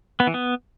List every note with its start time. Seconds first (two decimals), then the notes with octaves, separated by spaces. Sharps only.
0.20 B3
0.27 E3
0.34 B3